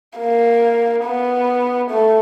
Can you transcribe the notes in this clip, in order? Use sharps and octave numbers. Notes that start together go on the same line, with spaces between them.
A#3
B3
A3